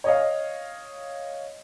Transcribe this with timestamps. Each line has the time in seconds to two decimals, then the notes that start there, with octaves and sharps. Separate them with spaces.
0.04 C#5 D#5 F5